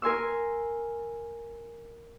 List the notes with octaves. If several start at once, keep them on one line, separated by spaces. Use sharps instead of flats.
A#4 G#5 C6 E6